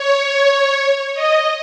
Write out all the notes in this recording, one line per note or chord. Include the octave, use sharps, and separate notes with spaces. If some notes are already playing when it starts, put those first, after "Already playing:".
Already playing: C#5
D#5